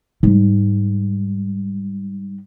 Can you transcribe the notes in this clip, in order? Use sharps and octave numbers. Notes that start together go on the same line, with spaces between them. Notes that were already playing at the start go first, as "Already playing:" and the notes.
G#2 G3